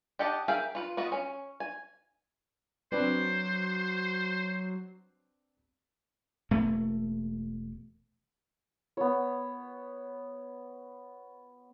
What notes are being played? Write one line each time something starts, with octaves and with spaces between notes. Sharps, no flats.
G4 D#5 F#5 A5
G#4 A#4 E5 F5 G5
F4 B4
B3 F4 F#4 D#5
C#4
G#5
F#3 C4 D4 B4 C5
E1 A3 A#3
B3 C#5